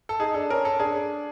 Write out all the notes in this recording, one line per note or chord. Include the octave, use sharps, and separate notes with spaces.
A4
D#4 G#4
D4 A4
C#4 A#4
A4
D4 G#4